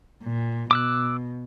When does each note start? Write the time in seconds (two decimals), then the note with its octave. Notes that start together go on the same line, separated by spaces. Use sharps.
0.24 A#2
0.71 B2 D6 E6 F#6